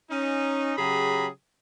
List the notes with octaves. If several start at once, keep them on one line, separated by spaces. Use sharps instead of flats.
C#4 D#4
C#3 F#3 G4 G#4 A#5 B5